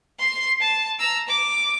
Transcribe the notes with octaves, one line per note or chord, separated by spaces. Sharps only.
C6 C7
A5
A#5 E6
D6